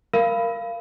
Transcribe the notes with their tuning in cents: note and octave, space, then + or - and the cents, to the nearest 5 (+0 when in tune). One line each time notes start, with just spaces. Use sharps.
A#4 +0 F5 -20 B5 +0